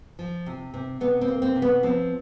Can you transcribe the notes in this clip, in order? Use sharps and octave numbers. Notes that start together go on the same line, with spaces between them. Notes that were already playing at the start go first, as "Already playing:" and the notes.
F3
C3
C3
C3 B3
C4
A#3
C4
C3
B3
F3 C4